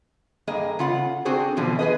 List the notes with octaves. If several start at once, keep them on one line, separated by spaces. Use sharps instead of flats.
G2 A#3 G#4 D#5
C#3 F4 F#5
C4 D4 F#4 G#4 C5
E2 B2 D3 F3
G#4 B4 D#5